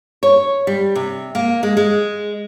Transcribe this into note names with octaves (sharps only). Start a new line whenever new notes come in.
C#5
G3
C3
A#3
G#3
G#3